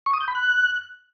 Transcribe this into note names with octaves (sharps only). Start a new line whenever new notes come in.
C#6
D#6
G6
B5
F#6